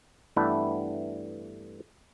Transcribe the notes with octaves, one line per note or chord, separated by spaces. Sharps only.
G2 E3 A3 B3 D4 E4